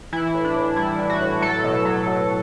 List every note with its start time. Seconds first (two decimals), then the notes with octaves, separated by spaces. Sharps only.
0.13 E3 E4
0.34 A2
0.45 D4
0.56 A2
0.76 G3 E4
0.99 E3
1.10 F#4
1.21 A2
1.42 F#3 A4
1.64 B2
1.85 F#3
2.07 B2